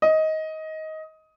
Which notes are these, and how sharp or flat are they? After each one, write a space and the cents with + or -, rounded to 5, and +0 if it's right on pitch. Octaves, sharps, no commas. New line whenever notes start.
D#5 +15